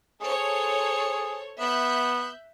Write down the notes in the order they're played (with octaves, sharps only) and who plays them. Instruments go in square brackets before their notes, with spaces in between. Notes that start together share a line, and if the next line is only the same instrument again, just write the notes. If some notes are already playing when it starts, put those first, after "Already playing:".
[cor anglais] G#4 [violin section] A4 C5 C#5
[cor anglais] B3 [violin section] E5 F#6 G6